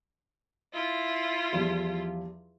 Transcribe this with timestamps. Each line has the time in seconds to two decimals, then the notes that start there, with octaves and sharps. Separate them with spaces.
0.73 E4 F4
1.53 E2 F3 G3